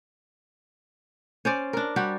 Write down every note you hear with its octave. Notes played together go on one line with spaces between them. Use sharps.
C#4 C5 D5
D4 A#4
G3 F#4 G4